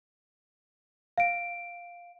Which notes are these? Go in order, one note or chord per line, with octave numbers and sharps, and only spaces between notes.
F5 D7